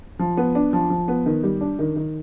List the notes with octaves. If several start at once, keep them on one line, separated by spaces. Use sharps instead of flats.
F3
B3
D4
F3
F3
B3
D#3
G3
D4
D#3
D#3